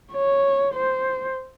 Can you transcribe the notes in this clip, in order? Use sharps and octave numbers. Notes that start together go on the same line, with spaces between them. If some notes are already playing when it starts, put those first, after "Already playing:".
C#5
C5